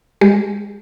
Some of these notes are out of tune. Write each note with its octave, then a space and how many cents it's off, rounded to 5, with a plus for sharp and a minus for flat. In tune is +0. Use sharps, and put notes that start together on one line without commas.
G#3 -25 G4 +0